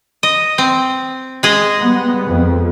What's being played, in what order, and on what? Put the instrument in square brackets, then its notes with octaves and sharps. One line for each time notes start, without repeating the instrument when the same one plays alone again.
[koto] D#5
C4
G#3 G#4 D#5
[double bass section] G3 B3
F2